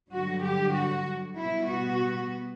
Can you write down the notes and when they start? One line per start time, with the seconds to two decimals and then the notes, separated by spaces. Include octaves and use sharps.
0.11 G2 D3 F#3 F#4
0.42 G4
0.74 F#4
1.38 B2 G3 B3 E4
1.70 F#4